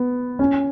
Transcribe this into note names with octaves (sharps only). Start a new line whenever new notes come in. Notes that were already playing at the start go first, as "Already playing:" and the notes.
Already playing: B3
C#4